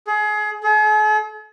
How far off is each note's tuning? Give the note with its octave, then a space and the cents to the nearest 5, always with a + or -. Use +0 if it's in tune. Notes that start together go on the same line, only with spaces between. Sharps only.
G#4 +30
G#4 +45